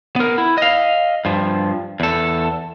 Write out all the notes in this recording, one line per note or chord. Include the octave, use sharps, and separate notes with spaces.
B3 A#4
E4
D#5 F5
G2 F3
E2 A4